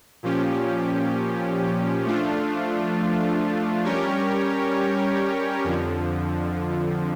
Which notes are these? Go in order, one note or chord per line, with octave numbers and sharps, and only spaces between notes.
A#2 F3 C#4 G4
F3 A3 D4 F4
G3 C#4 G4 A#4 C#5
F2 D3 F3